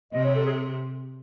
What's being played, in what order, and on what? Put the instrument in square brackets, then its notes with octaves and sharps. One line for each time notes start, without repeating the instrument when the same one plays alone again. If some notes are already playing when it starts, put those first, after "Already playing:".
[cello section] C3 [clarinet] D#5
[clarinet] C#5
A4
G#4